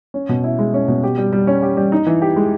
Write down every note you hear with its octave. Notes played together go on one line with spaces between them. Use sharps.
C#4
B2
E4
G#3
C#4
B2
G4
G3
G3
C#4
G4
G3
D#4
E3
G4
G#3